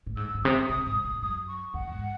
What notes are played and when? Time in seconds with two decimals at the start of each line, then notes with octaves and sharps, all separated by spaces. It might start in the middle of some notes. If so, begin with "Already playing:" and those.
0.07 A2
0.17 G#2 E6
0.34 G#2
0.43 C3 D#6
0.52 A2
0.69 C3 D#6
0.86 G#2 D#6
1.04 A2 D#6
1.21 F#2 D#6
1.48 C#6
1.74 E2 F#5
1.91 G#2